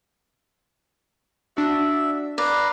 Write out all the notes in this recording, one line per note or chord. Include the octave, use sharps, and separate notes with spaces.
D4 F#4 E5
B4 D5 F5 A#5